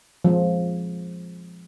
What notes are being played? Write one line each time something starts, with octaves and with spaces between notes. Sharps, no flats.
F3 G#3